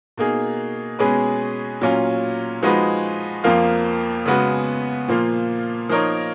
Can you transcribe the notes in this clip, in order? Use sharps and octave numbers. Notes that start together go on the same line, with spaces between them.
B2 A#3 D#4 G#4
B2 G#3 C#4 G#4 B4
A#2 F#3 C#4 F4
F3 G#3 D#4 F#4 B4
F2 F3 A#3 F4
C#3 G#3 B3 F#4 B4
A#2 F3 A#3 F4
F3 A#3 D#4 A#4 C#5